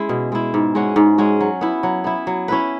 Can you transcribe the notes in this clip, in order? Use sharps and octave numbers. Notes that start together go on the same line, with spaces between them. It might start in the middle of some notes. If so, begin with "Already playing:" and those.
Already playing: G#3 C#4 E4
B2
G#3 E4
G#2
G#3 C#4 F#4
G#2
G#3 C#4 F#4
F#3
B3 E4
F#3
B3 E4
F#3
C#4 E4 B4